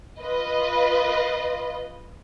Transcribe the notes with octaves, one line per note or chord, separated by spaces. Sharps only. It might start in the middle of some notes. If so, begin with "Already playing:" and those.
F4 B4 D#5